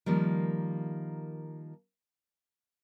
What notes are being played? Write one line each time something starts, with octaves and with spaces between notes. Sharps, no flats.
D#3 F3 G3 A#3